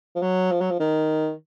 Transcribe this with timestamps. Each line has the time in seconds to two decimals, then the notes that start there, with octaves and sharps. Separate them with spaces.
0.15 F3
0.22 F#3
0.52 F3
0.61 F#3
0.71 F3
0.80 D#3